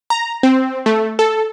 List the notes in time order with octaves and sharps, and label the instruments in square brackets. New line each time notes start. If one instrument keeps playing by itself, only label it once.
[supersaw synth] A#5
C4
A3
A4